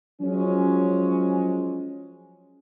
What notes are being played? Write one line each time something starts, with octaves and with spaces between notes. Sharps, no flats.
F3 F#3 G#3 C#4